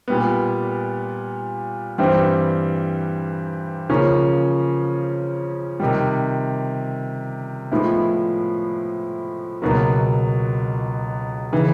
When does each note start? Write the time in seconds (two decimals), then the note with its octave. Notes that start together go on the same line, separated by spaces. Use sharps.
0.08 A#2 G3 B3
1.98 G2 E3 G3 C4
3.89 C#3 F3 A#3 C#4
5.80 C3 D#3 G3
7.72 A2 F3 G#3 B3 E4
9.62 C#2 B2 F#3 A#3
11.52 C#3 E3